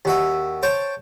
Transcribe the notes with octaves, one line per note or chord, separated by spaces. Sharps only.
D#2 F#4 E5
C5 C#5 G5 A5